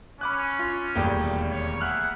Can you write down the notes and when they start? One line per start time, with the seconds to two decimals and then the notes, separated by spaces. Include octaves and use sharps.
0.21 C#4 B5 D6 F#6
0.59 F4
0.95 E1 D#2 G3 A3 A#3 G5
1.50 C#5
1.81 G#4 E5 F#5 F6 F#6